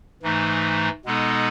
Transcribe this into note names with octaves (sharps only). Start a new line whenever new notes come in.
G#2 E3 A3 D#4
B2 G#3 B3 D#4 A4